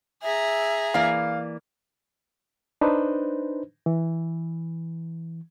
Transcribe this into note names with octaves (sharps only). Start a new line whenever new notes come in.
G#4 E5 A#5
E3 A#3 D5 F5
D4 D#4 B4 C5
E3